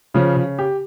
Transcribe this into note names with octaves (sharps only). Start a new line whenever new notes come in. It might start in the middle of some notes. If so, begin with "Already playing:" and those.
C#3 F3
C#3
G4